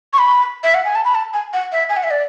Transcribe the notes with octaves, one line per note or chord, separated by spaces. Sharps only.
C#6
B5
E5
F#5
G#5
A5
B5
A5
G#5
F#5
E5
G#5
F#5
E5
D5